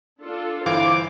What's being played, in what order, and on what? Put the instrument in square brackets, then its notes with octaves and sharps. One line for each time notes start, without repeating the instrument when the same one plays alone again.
[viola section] D4 F4 A4
[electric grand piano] G1 E3 F5 [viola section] C5 [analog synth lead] D6